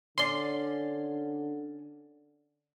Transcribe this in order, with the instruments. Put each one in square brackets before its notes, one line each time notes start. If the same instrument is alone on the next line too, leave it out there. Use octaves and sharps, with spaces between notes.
[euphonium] D3 [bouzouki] C#4 D5 [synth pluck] C6